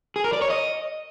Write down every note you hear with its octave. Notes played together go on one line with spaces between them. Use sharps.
G#4
A#4
D5
C#5
D#5